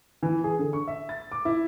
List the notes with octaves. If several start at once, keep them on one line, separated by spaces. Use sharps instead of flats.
E3
G#4
D3
C#6
E5
A6
D6
E4